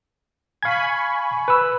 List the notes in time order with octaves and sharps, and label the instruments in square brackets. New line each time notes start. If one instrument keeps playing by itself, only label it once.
[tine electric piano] F5 G#6 [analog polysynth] G#5 B5 C#6
[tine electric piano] B4 E6